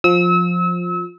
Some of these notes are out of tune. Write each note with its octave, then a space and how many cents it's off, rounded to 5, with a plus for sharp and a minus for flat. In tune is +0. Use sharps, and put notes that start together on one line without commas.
F3 +15 E6 -35